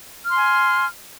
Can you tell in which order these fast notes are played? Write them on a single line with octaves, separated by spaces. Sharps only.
F6 C6 G#5